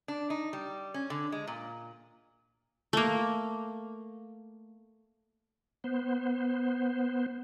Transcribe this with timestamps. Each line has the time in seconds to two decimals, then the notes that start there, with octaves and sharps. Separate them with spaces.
0.08 D4
0.30 D#4
0.53 G3
0.94 C#4
1.10 D3
1.32 G#3
1.47 A#2
2.93 A3 A#3
5.84 B3 C5